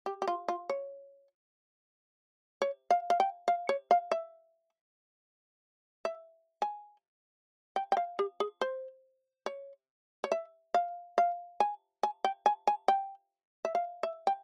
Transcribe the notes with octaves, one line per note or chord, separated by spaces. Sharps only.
G4
G4
F4
F4
C#5
C#5
F5
F5
G5
F5
C#5
F5
E5
E5
G#5
G5
G5
F5
G4
G#4
C5
C#5
C#5
E5
F5
F5
G#5
G#5
G5
G#5
G#5
G5
E5
F5
E5
G5